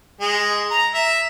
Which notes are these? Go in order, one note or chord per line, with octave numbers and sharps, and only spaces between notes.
G#3
A#5
E5